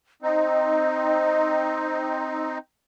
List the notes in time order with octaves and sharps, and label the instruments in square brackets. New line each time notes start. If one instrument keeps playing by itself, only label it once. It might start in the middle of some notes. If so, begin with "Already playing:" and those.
[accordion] C4 D#4 [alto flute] D#5